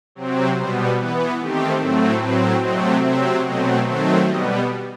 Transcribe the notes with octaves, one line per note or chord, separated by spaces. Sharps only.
C3 F#3 C4
B2 G3 B3 C5
E3 B3 B4
D#3 A3 C4 G4
A2 F#3 A3 C4
A2 F#3 C4 B4
C3 F#3 A3 C4 D#5
C3 F#3 C4 E5
B2 F#3 A3 C4 D#5
D#3 F#3 A3 C4 C5
B2 G3 B3 D#5